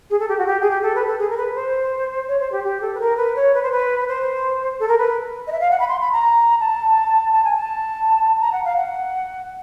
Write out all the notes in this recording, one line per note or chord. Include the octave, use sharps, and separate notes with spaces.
G#4
A4
G4
F#4
G4
G#4
G4
A4
B4
A4
G#4
A#4
B4
C5
C#5
C5
G4
G4
A4
B4
A#4
B4
C#5
B4
C5
B4
C5
A4
A#4
B4
D#5
E5
F5
F#5
B5
C6
B5
A#5
A5
A5
G#5
A5
A#5
F#5
F5
F#5